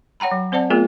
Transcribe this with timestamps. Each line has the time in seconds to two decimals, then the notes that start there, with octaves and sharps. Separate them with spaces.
0.20 C#5 F#5 G5 A#5 B5
0.31 F#3
0.52 C4 C5 D5 F#5 A5
0.70 A3 B3 F4 G#4 A#4